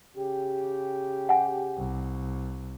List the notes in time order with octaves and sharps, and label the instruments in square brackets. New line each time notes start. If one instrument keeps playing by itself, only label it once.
[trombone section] C#3 G4
[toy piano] F#5 G#5
[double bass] C2